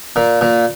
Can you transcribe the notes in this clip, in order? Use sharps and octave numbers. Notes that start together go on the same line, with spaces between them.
A#2
A#2